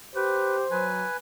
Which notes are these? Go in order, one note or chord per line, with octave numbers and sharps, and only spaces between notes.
G4 B4 C5
F#3 B4 G#5